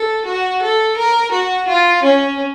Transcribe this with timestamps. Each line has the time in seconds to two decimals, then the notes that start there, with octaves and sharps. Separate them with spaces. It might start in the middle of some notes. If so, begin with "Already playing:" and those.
Already playing: A4
0.26 F#4
0.62 A4
0.97 A#4
1.32 F#4
1.68 F4
2.03 C#4